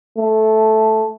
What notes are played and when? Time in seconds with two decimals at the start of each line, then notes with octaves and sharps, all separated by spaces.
0.18 A3